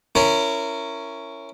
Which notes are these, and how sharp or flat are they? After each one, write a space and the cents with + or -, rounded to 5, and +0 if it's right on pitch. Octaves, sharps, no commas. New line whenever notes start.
C#4 +0 E4 +15 A#4 -15